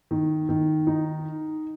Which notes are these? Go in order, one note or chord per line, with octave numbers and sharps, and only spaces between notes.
D#3
D#3
D#4